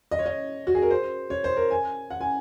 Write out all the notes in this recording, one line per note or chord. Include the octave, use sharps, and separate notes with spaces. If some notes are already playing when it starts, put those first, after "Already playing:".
D#5
C#5
D#5
F#4
G#4
A#4
C5
C#5
C5
A#4
G#5
F#5
G#5